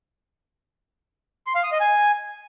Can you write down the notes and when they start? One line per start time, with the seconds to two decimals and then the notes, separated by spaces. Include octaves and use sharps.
1.47 C6
1.55 F5
1.64 D#6
1.72 D#5
1.80 G#5